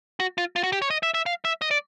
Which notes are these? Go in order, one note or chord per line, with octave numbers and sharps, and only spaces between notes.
F#4
F4
F4
F#4
G4
C#5
D#5
E5
E5
F5
E5
D#5
D5